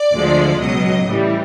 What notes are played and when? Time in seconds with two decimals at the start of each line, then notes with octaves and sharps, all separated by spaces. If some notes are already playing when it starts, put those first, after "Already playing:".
Already playing: D5
0.13 D2 D3 F3 G#3
0.60 C#2 B2 F#3 D#5
1.06 A2 E3 G3